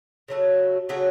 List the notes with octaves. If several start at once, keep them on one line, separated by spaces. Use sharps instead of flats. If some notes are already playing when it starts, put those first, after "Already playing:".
C#3 F#3 A3 F#4
C#3 F#3 A3 F#4